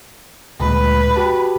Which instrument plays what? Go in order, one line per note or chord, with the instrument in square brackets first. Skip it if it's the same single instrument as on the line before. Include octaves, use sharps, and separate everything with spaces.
[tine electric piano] D2 A#2 G#3 [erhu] B4
[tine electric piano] F#4 G4 A5